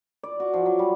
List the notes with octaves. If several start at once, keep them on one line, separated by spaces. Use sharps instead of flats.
D5
F#4
F3
F#3
G3